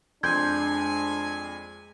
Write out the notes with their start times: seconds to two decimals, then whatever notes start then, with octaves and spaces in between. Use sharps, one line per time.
0.23 F2 G#3 D4 G#5 C6 G6 G#6